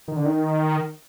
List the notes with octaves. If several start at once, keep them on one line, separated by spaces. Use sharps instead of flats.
D#3
D3
D#3